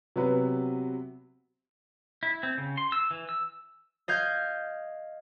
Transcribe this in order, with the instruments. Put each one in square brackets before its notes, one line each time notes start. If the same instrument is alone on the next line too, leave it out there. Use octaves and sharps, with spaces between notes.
[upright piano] C3 F#3 B3 B4
[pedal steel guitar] E4
C4
C#3
C6
E6
E3
E6
[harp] D#5 F5 G6 G#6